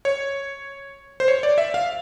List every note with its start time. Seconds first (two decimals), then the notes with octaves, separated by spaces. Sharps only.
0.05 C#5
1.20 C5
1.28 C#5
1.43 D5
1.58 E5
1.74 F5